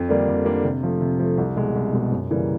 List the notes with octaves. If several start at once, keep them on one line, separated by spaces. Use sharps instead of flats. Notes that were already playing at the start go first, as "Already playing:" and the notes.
Already playing: F2
D3 G3 A#3 D4
F2
D3 G3 A#3 D4
C3
F3 A3
C3
F3 A3
C2
B2 G#3
C2
B2 G#3
F#2
C#3 E3 G3 A#3